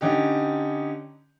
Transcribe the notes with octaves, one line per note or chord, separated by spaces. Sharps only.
D3 C#4 D#4 G4